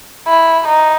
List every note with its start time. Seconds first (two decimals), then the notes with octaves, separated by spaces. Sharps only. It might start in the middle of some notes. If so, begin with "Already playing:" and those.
0.27 E4
0.68 D#4